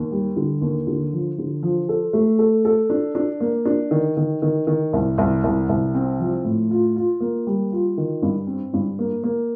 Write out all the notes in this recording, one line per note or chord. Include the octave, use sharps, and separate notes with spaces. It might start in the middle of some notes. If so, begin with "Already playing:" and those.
Already playing: D#2
G3
D3
D#2
D3
F3
D3
F3
A4
A3
A4
A4
D4
D4
A#3
D4
D#3
D#3
D#3
D#3
C2
C2
C2
C2
C4
F3
A2
F4
F4
A#3
G3
F4
D#3
G2
C4
G2
A#3
A#3